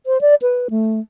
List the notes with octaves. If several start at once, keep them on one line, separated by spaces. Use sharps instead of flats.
C5
D5
B4
A3